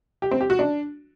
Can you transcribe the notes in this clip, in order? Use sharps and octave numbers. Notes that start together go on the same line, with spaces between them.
G4
C4
G4
F#4
D4